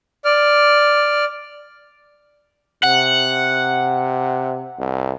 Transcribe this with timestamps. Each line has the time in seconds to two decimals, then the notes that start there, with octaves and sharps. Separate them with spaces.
0.25 D5 F6
2.84 C3 F#5
4.79 C2